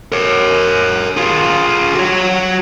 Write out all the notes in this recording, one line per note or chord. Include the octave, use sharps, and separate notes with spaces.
A#4 C#5
F4 G#4
F#4 C#5